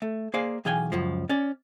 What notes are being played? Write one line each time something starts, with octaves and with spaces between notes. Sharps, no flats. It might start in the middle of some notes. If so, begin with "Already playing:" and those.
A3
A#3 G#4 C5 D5 F5
B1 E3 G#4 F5 G5 G#5
C#2 F#2 F3
C#4 D5